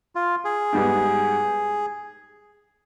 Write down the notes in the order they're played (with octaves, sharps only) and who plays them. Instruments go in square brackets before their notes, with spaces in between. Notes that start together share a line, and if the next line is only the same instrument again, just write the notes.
[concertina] F4
G#4
[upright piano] G#2 G3 B3